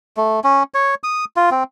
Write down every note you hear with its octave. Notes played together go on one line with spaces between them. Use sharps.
A3
C#4
C#5
D#6
F4
C4